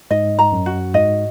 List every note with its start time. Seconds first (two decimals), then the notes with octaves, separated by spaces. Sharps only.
0.11 G#2 D#5
0.39 A#5
0.52 F#2
0.66 F#4
0.94 G#2 D#5